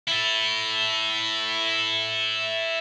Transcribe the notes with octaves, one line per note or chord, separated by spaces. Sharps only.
E4 A4